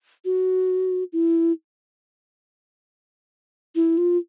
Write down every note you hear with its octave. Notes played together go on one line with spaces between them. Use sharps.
F#4
E4
E4
F4